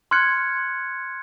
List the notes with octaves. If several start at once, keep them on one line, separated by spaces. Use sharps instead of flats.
C6 F6 F#6 G#6 C#7